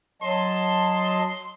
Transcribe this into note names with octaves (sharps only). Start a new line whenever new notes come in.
F#3 D#5 A5 C6